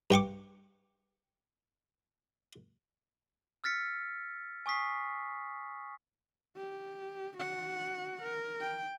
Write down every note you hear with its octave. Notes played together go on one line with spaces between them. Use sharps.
G2 G5 C#6 D6
E6 F6 A6 B6 C#7
G#5 C#6 D#6 B6 C7
G4
F#4 F#5
A#4
G5